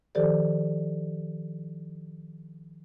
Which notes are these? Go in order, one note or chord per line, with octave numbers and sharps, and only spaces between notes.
D#3 F3 G4 A4 C5 D5